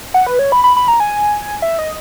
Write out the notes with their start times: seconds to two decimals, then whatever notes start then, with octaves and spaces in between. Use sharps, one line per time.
0.14 F#5
0.26 B4
0.39 C#5
0.52 B5
0.64 B5
0.77 B5
0.88 A#5
1.00 G#5
1.62 E5
1.79 D#5